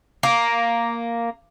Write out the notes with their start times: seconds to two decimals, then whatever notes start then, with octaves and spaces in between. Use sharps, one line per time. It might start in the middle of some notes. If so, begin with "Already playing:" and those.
0.23 A#3